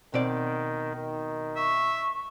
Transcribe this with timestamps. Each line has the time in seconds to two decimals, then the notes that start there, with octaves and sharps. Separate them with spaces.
0.14 B2 D#3 C4 D5
0.96 D#3
1.56 E5 C#6